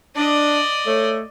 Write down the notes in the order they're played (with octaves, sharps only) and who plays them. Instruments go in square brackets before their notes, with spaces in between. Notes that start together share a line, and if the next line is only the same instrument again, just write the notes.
[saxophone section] D4 [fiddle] D5 D#5
[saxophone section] A3 C#5